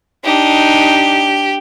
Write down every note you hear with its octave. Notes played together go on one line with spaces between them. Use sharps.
D4 D#4 G4